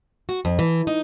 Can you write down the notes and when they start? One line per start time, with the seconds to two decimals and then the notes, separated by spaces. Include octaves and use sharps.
0.29 F#4
0.45 F2
0.59 E3
0.87 D#4